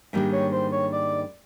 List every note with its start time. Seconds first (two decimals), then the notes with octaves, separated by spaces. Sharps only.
0.13 G#2 D#3 G3 A#3 D4
0.32 C#5
0.52 C5
0.72 C#5
0.93 D5